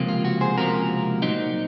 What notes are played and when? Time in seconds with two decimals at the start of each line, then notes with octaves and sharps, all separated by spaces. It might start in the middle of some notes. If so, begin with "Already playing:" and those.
Already playing: C#2 C3 F3 A#3
0.08 F4
0.25 F#4
0.41 G#4 C5
0.57 C#2 C3 F3 A#3 F#4 A#4
1.22 A#2 F#3 C4 D#4